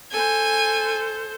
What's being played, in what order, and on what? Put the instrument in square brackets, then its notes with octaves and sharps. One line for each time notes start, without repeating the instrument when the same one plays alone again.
[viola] A4 C5 [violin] G#5